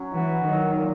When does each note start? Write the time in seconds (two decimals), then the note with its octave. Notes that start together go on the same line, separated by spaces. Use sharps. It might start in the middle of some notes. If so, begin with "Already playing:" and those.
Already playing: F#3 C#4
0.13 E3 F#4
0.44 D#3 F#3
0.75 A#2